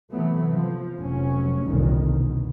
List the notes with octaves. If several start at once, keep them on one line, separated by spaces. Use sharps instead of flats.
C3 E3 F#3 A3 B3
F3
F1 F#3 C#4
G1 C2 F2 A#2 D#3
B2